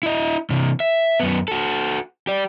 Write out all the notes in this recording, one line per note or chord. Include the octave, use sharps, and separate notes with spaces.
E4 D#5
C3 E3
E5
F#2 B3
F#4 A4
G4 D5